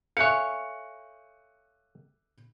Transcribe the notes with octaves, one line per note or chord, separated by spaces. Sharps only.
A4 C#5 E5 F5 G#5 F#6 C#7